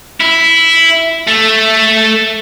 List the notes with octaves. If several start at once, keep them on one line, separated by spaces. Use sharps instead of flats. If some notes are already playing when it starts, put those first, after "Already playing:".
E4
A3